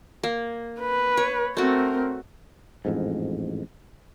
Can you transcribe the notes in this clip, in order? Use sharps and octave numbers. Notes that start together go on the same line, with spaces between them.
A#3
B4
C#5
A3 C4 F#4 A#4
A1 F2 G#2